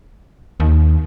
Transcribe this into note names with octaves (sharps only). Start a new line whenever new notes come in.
D#2